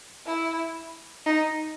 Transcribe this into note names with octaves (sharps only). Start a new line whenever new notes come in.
E4
D#4